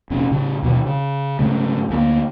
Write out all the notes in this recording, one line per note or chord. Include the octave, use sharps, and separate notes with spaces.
F1 A#2 C#4
A2 C#3
D#2 B2 E3
C#3
G#2 C#3 A3
D2 F#3 A#3